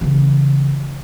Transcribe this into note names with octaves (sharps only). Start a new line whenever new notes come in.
C#3 E3